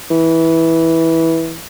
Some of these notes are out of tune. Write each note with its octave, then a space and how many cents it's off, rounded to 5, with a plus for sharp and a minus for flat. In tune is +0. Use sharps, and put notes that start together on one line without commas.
E3 -10